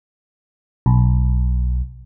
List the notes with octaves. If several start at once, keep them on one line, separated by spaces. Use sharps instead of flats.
B1